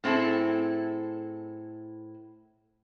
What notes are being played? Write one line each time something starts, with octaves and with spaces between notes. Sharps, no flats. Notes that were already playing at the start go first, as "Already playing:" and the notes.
A2 C4 E4 G#4 A4